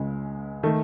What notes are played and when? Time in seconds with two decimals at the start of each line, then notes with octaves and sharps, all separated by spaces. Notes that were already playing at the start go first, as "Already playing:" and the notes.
Already playing: C#2 C#3 G#3
0.63 D#3 A3